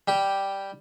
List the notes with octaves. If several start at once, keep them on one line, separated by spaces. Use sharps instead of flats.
G3 G4